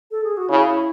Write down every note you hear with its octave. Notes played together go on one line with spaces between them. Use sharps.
A4
G#4
F#4
C#3 E4